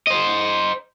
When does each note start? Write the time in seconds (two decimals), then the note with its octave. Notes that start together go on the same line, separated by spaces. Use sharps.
0.07 C5 D#5